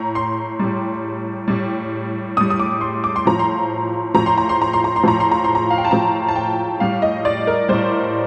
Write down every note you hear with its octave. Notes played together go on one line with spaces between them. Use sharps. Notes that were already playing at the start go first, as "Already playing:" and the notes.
Already playing: A2 A#5
C6
A2 G3
A2 G3
A2 G3 D#6
D#6
D6
C6
D6
C6
A2 F3 A#5
C6
A2 F3 A#5
C6
A#5
C6
A#5
C6
A#5
C6
A2 F3 A#5
C6
A#5
C6
A#5
F5
G5
A5
A2 F3 A#5
A5
G5
A2 G3 F5
D#5
D5
A#4
A2 G3 C5